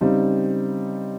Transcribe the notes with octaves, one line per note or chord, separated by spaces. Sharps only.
C#3 G3 C4 D#4